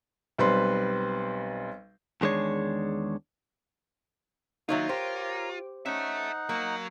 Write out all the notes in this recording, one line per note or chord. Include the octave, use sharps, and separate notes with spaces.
B1 G3 C4 B4 C6
E2 D#3 G#3 D4 C#5
D#3 F#3 A#3 D#4 F4 C#5 E5
G4 A#4 C5 C#5 A#5
C#4 D#4 A4 E5 F#5
F#3 A#3